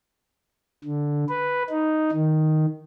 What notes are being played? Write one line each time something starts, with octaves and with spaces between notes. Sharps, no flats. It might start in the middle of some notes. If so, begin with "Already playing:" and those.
D3
B4
D#4
D#3